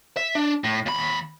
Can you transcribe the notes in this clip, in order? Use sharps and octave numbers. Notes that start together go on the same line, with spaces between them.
E5
D4
A2
D#2 B5